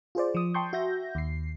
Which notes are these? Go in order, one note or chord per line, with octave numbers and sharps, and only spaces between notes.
F4 G#4 C5 D5
F3 D#6
G5 A5 C6 C#6 G6
F#4 E5 G6 A#6
D#2 C7